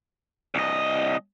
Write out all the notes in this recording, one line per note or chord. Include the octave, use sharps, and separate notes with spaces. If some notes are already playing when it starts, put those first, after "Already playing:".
C2 D#5